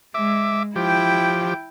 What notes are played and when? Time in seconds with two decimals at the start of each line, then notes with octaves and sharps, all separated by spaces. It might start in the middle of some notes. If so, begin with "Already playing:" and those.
0.14 G#3 E5 D6
0.76 F3 E4 G4 G5